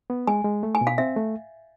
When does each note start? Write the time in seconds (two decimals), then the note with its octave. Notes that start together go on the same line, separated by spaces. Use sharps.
0.10 B3
0.27 G#3 G#5
0.44 G#3
0.63 A3
0.75 G#5
0.81 B2
0.87 F5
0.98 C4 E5
1.17 A3